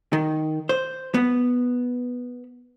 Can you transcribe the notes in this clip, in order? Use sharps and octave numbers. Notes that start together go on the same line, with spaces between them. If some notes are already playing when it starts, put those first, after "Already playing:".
D#3
C5
B3